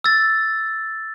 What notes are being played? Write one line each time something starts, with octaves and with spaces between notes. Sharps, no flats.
E6 A6